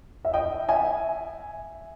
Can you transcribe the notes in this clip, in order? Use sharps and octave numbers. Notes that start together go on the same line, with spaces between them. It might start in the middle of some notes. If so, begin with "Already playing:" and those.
E5
D#5 G5
E5 G#5